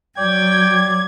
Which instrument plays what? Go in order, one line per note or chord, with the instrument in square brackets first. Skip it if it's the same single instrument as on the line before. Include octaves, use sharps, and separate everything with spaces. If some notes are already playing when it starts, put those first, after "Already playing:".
[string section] F#3 [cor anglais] D5 [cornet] G5 [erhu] G#6